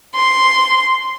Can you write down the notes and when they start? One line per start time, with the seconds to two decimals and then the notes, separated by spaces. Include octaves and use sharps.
0.16 C6